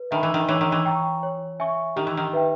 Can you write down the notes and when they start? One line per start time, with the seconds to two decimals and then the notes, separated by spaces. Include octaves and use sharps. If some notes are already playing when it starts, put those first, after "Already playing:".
Already playing: B4
0.11 D#3 E5 G#5 B5
0.23 E3
0.34 D#3
0.48 E3 C#5
0.61 D#3
0.72 E3
0.85 G5 A#5 C#6
1.23 C#5
1.60 E5 G#5 C#6
1.96 D#3 G4
2.07 E3
2.17 D#3
2.33 B4 E5 G5